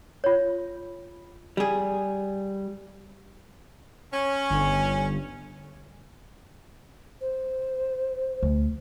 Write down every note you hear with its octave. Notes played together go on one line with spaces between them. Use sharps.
F4 C#5
G3 G#4
C#4
G1
C5
D2